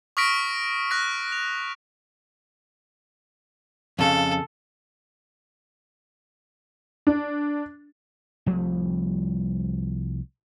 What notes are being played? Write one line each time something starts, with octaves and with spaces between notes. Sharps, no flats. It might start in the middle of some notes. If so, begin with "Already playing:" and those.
C#6 D#6 F6 A#6 B6 D7
C#6 F#6 A#6 B6
F7
F2 C#3 A4
D4
C2 F3 G3 A3